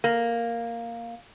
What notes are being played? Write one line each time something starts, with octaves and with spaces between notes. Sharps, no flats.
A#3